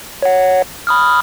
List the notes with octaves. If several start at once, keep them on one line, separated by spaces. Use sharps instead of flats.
C#5 F#5
B5 D#6 F6